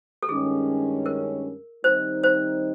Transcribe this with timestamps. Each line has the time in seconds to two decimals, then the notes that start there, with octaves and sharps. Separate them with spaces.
0.23 A4
0.28 G2 D#3 G#3 C#4 G#4
1.06 A#4
1.84 D#3 G3 C4 D#4 C5
2.24 C5